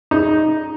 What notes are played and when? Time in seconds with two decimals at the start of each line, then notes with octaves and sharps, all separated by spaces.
0.11 D#4